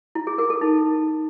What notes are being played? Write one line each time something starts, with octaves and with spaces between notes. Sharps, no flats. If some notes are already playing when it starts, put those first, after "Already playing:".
E4
G#4
A#4
A4
D#4